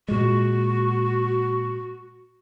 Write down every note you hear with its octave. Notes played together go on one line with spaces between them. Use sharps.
A#2 G#3 F#4